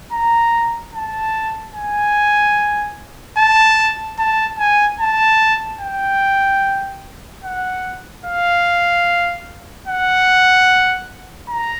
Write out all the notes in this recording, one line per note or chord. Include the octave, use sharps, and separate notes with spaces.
A#5
A5
G#5
A5
A5
G#5
A5
G5
F#5
F5
F#5
A#5